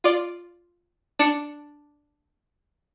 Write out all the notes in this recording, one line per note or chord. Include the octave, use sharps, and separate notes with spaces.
F4 D5
D4 C#7